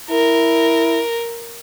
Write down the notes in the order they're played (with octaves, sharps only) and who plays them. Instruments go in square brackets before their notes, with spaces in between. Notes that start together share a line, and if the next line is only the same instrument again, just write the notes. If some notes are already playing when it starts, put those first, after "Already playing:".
[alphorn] E4 [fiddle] A#4